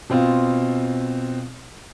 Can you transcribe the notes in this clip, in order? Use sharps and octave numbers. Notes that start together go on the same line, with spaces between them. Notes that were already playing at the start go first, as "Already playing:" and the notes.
B2 C4 F4